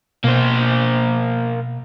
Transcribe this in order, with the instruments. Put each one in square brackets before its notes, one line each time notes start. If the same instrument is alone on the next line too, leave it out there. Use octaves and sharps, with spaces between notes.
[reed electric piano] B2 [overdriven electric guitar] A#3 C5